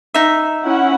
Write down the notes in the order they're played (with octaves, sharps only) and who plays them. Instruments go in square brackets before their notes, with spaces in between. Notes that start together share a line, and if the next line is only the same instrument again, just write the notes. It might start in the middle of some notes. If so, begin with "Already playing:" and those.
[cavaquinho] D#4 E5
[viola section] C#4 E4 F#5